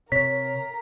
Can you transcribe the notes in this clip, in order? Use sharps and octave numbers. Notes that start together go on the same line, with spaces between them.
C3 A#4 C#5 B6